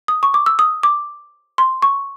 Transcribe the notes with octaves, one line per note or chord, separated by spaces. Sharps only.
D#6
C#6
D6
E6
D#6
D6
C6
C#6